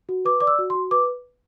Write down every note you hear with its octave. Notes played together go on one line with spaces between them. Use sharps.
F#4
B4 D6
D5 D6
E6
F#4
C6
F#4
B4 D6